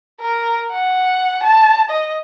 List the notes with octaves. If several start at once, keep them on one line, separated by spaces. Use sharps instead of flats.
A#4
F#5
A5
D#5